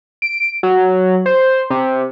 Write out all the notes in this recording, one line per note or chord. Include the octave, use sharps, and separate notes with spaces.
D7
F#3
C5
C3